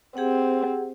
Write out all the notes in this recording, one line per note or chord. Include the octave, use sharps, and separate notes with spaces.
C4 G4 G#4 F#5